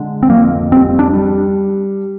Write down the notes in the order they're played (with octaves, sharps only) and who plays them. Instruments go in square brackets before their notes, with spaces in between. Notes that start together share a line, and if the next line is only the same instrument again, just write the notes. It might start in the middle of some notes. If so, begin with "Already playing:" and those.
Already playing: [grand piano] D3 G#3
[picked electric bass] C4
[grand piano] F2 [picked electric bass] A#3
[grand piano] G3 [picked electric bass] C4
[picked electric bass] D4
[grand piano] G3